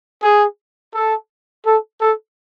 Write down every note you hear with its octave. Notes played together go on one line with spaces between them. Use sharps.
G#4
A4
A4
A4